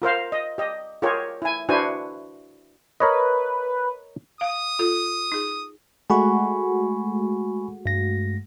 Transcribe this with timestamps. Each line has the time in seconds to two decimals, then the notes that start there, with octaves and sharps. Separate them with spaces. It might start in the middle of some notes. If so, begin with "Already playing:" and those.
0.02 F4 A#4 C5 F5
0.32 D#5
0.58 G4 D#5
1.02 F4 G4 G#4 A#4 C#5
1.42 E4 G#5
1.69 D4 E4 F#4 B4 C5 G#5
3.00 A#4 B4 C#5 D#5
4.41 F5 D#6
4.79 F4 A4
5.32 D#4 G#4
6.10 G#3 A3 F#4 G#5 B5 C#6
7.86 G2 A#6